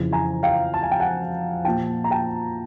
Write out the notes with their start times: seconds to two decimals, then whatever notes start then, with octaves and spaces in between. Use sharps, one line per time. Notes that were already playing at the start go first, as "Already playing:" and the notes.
Already playing: F2 C#3 E3
0.12 G#5 A#5
0.43 F5 G5
0.74 A5
0.83 G#5
0.91 G5
1.00 F#5 G#5
1.65 A#2 F3 G5 A5
2.04 A#5
2.11 G5 A5